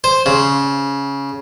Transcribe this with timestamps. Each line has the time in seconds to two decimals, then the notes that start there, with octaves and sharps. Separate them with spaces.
0.04 C5
0.26 C#3